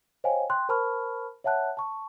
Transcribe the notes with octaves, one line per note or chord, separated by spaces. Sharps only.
C5 C#5 D#5 F5 G5 G#5
G5 C6 F#6
A#4 C5 A5 B5 C#6 F6
C#5 E5 F#5 A5 F#6
A5 C#6